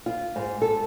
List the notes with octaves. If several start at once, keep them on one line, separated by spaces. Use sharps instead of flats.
F4
G#2
A4